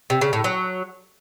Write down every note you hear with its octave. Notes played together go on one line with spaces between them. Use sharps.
C3
C#3
A2
F#3